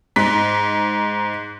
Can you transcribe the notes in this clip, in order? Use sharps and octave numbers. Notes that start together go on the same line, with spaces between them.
G#2 B6